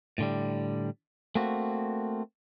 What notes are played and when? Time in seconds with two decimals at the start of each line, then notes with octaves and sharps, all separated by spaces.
0.18 A2 D3 G3
1.35 A3 A#3 C4 F#4